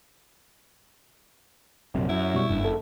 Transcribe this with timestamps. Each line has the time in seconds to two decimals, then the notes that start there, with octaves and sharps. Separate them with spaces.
1.95 A#1 F#2 C3
2.09 F#2 E4
2.34 B2 G3 C#6
2.50 F#1 G2
2.65 A4